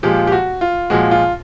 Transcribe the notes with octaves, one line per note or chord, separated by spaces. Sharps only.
A#2 F3 G#3 G4
G4
F#4
F4
A#2 F3 G#3 F#4
F4